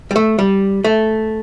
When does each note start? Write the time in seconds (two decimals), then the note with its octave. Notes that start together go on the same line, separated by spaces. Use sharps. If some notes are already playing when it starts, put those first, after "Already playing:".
0.11 G3
0.16 A3
0.39 G3
0.84 A3